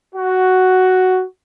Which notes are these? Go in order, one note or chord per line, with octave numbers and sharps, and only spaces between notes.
F#4